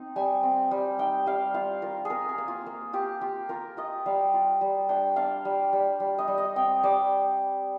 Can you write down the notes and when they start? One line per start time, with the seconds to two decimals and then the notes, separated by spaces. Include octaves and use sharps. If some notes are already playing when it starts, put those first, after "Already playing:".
Already playing: C4 D#4
0.16 G3 G#5
0.43 C4
0.71 G3
0.99 D#4 G5
1.26 G3 F5
1.54 F4 F5
1.82 F4 A#4
2.05 G#4
2.10 F4 A#4
2.29 G#4
2.38 A#3
2.48 F4
2.66 A#3
2.93 F4 G4
3.21 F4 G4
3.49 F4 A#4
3.77 F4 D#5
4.06 G3 F5
4.34 F4
4.61 G3
4.89 D4 G5
5.16 D4 F5
5.45 G3
5.73 G3
6.00 G3
6.18 D#5
6.28 G3
6.38 D#5
6.56 C4 G5
6.83 G3 D5